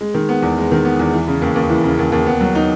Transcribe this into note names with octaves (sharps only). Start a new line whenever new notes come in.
G#3
D#3
B3
E2
G#3
D#3
B3
E2
E3
C#3
D#2
D#2
E3
C#3
D#2
D#2
B3
F#3
D#4